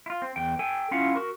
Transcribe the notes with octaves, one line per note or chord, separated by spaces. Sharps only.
E4 F4
C4
E2 G5
A4 G5 G#5
C#4 E4 F4 F5 F#5
F#4 A#4